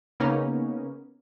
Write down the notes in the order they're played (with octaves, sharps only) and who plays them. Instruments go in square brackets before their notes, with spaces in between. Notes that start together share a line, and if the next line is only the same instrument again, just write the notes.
[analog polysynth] C#3 A#3 B3 C#4 D#4